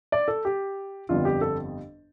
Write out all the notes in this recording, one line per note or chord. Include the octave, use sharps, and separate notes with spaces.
D5
A4
G4
G1 F2 D3 G3 B3 F4
G4
A4